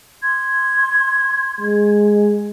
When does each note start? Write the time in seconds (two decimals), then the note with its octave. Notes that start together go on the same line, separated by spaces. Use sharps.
0.23 C6 G#6
1.61 G#3